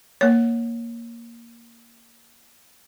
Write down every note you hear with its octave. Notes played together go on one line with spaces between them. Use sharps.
A#3 C#5